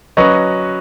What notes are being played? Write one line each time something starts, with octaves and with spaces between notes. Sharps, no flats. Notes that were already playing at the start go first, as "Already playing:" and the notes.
F#3 C#4 F#4 B4 D#5